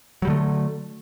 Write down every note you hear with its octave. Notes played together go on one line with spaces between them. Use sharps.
D3 F#3 G3 A3